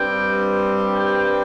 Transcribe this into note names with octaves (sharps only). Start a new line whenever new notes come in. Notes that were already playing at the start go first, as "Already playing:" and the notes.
Already playing: G2 G3 C4 G5
G5